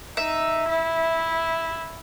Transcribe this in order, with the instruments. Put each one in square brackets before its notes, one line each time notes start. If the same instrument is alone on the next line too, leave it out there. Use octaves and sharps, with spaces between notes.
[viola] D#4 [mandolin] E5
[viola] E4